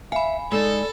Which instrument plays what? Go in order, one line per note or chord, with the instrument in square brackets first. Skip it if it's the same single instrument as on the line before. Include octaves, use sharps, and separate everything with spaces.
[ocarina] E5 [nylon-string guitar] F5 [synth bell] G#5 B5
[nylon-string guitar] G#3 D#4 [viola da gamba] A4 [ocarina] D5 [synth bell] B5